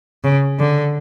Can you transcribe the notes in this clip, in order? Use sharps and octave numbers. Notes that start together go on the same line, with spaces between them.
C#3
D3